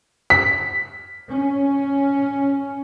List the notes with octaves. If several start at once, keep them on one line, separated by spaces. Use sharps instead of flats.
B6
C#4